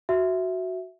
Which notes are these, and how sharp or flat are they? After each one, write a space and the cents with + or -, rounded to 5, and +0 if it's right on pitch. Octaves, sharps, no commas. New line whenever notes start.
F#4 +0 E5 +0